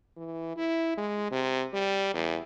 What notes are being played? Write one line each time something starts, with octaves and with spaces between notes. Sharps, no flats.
E3
E4
G#3
C3
G3
E2